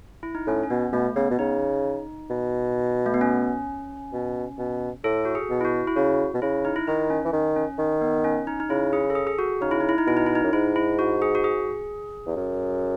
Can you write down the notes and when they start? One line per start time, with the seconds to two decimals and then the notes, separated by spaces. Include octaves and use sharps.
0.23 E4
0.35 D#4
0.47 A2 C#4
0.63 C#4
0.70 B2 B3
0.93 B2 A3
1.16 C#3 B3
1.30 B2
1.39 C#3 D#4
2.30 B2
3.06 A3
3.14 B3
3.21 C#4
4.13 B2
4.58 B2
5.04 A2 A4
5.25 F#4
5.35 G#4
5.50 B2
5.61 E4
5.65 F#4
5.87 E4
5.96 C#3 F#4
6.34 B2
6.42 C#3 E4
6.65 D#4
6.76 E4
6.88 D#3 D#4
7.10 C#4
7.25 E3
7.33 D#3
7.56 C#4
7.78 D#3
8.01 B3
8.24 C#4
8.47 D#4
8.60 D#4
8.70 C#3 E4
8.93 G#4
9.10 A4
9.15 G#4
9.27 G#4
9.39 F#4
9.61 C#3 D#4
9.71 E4
9.81 D#4
9.89 E4
9.98 D#4
10.07 B2 E4
10.17 D#4
10.26 E4
10.35 D#4
10.44 F#2
10.53 G#2 E4
10.76 E4
10.99 F#4
11.22 G#4
11.35 F#4
11.44 G#4
12.26 E2
12.36 F#2